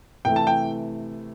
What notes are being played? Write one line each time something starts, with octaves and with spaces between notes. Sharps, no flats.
C3 E3 A3 G5
A5
G5